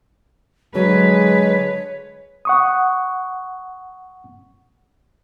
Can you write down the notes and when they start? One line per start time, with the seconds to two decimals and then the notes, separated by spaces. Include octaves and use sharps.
0.75 D3 F#3 G#3 B4 C#5
2.45 F#5 C#6 D#6